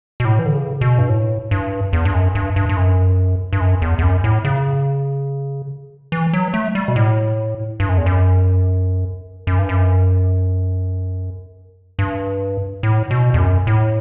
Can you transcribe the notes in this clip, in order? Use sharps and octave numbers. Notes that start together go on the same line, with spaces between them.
B2
A2
E3
D3
C#3
B2
G2
A2
G2
E2
G2
F#2
G2
G2
G2
F#2
G2
F#2
E2
E2
F#2
A2
C#3
E3
F#3
A3
G3
B2
A2
G2
F#2
E2
F#2
F#2
G2
F#2
G2
A2
B2
E2
F#2
A2